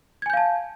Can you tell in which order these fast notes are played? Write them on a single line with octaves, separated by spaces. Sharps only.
G#6 G#5 G6 F5 A5